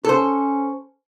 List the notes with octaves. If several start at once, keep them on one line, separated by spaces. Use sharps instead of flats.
C#4 A4 C5